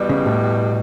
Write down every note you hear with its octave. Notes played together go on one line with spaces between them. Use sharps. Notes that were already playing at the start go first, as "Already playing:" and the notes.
Already playing: E2 B2 G3
C#3
A2